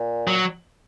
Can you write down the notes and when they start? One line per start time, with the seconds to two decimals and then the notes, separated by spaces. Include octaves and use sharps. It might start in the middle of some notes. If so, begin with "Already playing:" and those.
Already playing: A#2
0.28 F#3